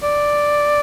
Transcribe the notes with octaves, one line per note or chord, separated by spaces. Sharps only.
D5